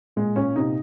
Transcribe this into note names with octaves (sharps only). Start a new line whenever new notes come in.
A#2 G#3
A#2 C#4
C3 D#4